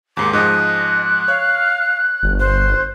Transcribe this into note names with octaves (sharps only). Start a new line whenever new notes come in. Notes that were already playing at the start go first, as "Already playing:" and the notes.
D#2 G#2 D#3 D6
G#2 F3 G#3 D#5 F#6
C#5 F5
G1
C5 F#6